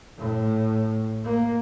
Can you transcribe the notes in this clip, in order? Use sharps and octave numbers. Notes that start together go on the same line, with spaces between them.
A2
A#3